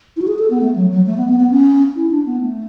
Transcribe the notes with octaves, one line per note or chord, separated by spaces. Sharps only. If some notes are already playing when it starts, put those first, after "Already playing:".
E4
F#4
G#4
A4
B3
A3
F#3
F#3
A3
B3
B3
B3
C#4
E4
D4
B3
A3